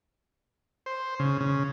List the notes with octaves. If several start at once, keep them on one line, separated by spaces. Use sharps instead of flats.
C5
C#3
C#3